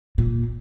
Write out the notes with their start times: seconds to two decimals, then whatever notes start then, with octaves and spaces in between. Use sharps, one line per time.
0.18 A#2